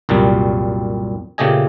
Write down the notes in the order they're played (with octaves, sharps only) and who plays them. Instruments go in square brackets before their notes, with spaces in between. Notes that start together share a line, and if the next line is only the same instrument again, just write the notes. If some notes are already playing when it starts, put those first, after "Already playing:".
[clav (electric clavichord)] C2 F#2 A#2 G3
A#2 C#3 A3 G4 D#5 G#5